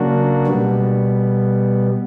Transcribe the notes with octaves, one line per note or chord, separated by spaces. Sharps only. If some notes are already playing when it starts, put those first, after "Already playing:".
Already playing: C#3 F#3 A#3 D4 F#4
B2 G3 B3